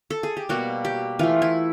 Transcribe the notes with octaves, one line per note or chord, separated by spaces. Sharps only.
A4
G#4
G4
B2 G3 A#3 F#4
G4
E3 A3 F4
E4